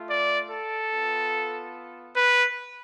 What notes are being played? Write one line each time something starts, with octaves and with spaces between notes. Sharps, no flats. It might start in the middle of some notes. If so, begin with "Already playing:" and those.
Already playing: A3 F4
D5
A4
B3 F4
B4